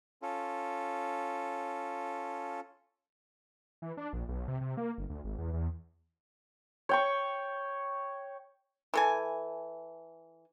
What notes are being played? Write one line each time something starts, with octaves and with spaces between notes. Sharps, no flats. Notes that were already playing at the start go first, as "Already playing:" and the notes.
C#4 F4 A4
E3
D4
A#1
B1
C3
C3
A#3
G1
D2
G#1
E2
E2
C#5 G5 C#6
E3 A4 G#5